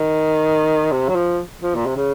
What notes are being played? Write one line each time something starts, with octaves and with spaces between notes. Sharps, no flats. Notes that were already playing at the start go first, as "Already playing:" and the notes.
Already playing: D#3
C3
F#3
F3
F3
A#2
C3
C#3